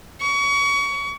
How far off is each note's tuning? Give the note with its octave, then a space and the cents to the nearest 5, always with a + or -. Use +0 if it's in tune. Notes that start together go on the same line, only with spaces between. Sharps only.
C#6 +30